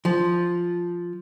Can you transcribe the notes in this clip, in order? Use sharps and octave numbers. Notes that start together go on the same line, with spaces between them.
F3